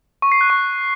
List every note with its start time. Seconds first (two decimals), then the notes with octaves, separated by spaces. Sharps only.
0.22 C#6
0.32 C7
0.41 F#6
0.50 C#6